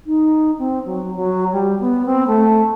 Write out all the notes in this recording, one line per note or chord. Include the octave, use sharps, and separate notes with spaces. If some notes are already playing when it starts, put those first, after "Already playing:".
D#4
C4
F#3
F#3
G3
B3
C4
A3